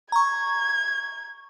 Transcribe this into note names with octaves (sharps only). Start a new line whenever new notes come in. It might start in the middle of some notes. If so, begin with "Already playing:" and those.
A#5 C#6 G#6